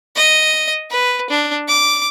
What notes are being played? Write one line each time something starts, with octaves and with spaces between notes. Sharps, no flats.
D#5
B4
D4
D6